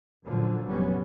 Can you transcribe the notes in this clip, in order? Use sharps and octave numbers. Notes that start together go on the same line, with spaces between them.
F#2 A#2 D3 F3 F#3
F1 F#3 G3 B3 C#4